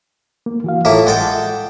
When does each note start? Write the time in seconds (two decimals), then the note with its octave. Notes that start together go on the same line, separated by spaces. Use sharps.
0.46 A#3
0.64 E3 F#4 F5
0.85 A2 A#3 E4 F4 A4 A5
1.07 G#3 A4 F#5 G5